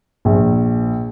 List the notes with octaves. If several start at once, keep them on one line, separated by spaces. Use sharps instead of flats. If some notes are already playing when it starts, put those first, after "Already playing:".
A#1